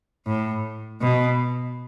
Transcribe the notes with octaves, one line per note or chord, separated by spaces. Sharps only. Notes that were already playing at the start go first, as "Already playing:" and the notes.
A2
B2